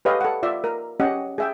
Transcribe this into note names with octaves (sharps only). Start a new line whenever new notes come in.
G4 A4 B4 C#5 D#5 F5
A4 F#5
F4 D5 E5
A#4
C#4 G4 D#5 F#5
G#4 E5 G5